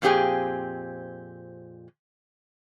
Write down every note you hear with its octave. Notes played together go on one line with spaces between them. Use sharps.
F2 A#2 C4 G4 G#4 G#5